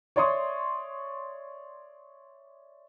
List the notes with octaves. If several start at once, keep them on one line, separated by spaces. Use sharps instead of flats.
C#5 D5 E5 C6 C#6 D#6